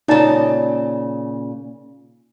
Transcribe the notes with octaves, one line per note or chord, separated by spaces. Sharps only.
A#2 C#3 D#4 D5 A5